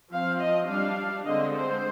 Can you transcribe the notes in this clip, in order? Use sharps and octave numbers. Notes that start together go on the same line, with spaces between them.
F3 C4 F5
D#5
G3 D4 F5
D3 G#3 C4 D#5
C5